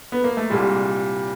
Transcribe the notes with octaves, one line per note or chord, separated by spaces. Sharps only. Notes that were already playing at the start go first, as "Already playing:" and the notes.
B3
A#3
A3
C2 A#2 G3 G#3